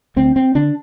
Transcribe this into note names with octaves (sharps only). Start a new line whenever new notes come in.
D2 C4
C4
D3 D4